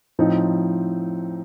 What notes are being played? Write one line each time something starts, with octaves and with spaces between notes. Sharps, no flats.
A2 F3 C4 D#4